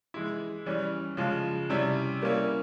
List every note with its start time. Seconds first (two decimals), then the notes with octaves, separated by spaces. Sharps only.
0.14 E3 G#3 E4
0.66 E3 G3 C#4
1.17 C#3 F3 G#3
1.70 C3 G3 C#4 E4
2.22 G3 A#3 C#4 E4